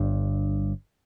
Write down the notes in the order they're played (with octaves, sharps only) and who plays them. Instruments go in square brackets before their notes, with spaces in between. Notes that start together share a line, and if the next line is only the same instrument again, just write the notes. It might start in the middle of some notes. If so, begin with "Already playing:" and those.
Already playing: [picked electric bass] G1 G2